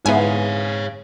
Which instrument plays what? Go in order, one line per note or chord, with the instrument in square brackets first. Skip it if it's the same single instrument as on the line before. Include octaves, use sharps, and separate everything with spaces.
[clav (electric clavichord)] G#2 [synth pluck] B3 E4 G#5 [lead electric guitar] C#5 F5